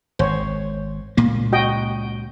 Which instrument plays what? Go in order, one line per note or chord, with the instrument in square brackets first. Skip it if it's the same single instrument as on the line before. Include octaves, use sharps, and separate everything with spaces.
[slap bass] G#1 [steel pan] C5 C#5
[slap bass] C#2 A#2 A#3
[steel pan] F#4 D#5 G5